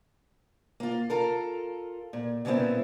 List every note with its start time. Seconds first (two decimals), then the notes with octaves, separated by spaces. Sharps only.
0.80 A#3 F4
1.10 F4 A4 A#4
2.13 A#2
2.45 A#2 C#3 G3 B3 C4 E4